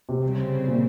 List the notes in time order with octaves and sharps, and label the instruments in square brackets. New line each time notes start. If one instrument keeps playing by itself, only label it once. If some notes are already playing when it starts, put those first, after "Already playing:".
[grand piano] C3
[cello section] C#3 G3 C4
[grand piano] A#2